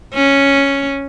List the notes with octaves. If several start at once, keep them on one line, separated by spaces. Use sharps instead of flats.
C#4